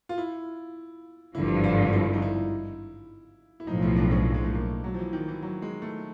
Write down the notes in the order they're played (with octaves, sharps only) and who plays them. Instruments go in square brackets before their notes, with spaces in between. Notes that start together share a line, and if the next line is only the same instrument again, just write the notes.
[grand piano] F4
E4
[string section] G#1 G2 D3 F3 [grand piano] E4
[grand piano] F4
E4
D#4
E4
E4
[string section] B1 A2 F3 [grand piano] D#4
[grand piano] E4
D4
C#4
G#3
A3
A#3
F#3
F3
E3
D#3
E3
F#3
G#3
A3